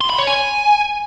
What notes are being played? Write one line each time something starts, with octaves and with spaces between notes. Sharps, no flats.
C6
B5
C#5
G#5